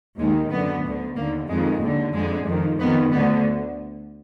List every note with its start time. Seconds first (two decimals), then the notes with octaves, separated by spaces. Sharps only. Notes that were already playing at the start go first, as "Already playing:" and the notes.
0.18 D#2 D#3 G#3
0.50 F#2 D3 B3
0.84 D2 D3
1.16 D#2 D3 A#3
1.48 F2 D#3 G#3
1.81 D#2 D3
2.13 F2 D3 G#3
2.46 F2 D#3
2.78 F2 D#3 B3
3.11 D2 D3 B3